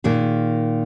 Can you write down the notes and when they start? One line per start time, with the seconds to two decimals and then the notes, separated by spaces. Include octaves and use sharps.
0.04 A#2 D#3 G#4